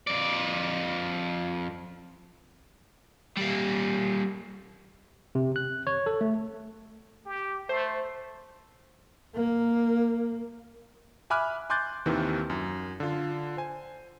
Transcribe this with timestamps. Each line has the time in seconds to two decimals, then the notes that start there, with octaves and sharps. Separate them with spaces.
0.07 F2 D5
3.37 G3 A#3
5.35 C3
5.56 F#6
5.87 C#5
6.06 A4
6.21 A3
7.26 G4
7.69 A3 C5
9.35 A#3
11.30 E5 G#5 B5 D6 F6 F#6
11.70 G#5 C6 D6 F#6 G6 A6
12.06 D#2 C3 D#3 E3 C4
12.50 F#2
13.00 D3 F4
13.57 C5 G#5